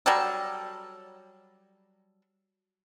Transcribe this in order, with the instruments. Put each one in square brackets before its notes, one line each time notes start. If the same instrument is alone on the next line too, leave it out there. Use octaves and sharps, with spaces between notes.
[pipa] F#3 G3 A4